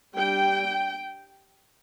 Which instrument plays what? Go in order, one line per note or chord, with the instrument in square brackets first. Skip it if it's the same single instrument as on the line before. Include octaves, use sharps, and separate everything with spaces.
[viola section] G3 D4 G5